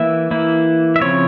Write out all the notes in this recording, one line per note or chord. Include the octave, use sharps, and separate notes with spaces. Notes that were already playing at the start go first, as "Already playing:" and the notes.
Already playing: E3 A#3 E4 E5
E3 A#3 E4
E5
C#3 F3 C4 E4 C#5